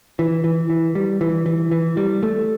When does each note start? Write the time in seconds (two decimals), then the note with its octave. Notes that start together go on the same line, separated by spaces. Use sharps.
0.19 E3
0.44 E3
0.70 E3
0.95 G3
1.21 E3
1.46 E3
1.71 E3
1.97 G3
2.23 A3